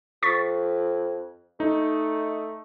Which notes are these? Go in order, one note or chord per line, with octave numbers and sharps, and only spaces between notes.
F2 C#6 A6 B6
A3 D#4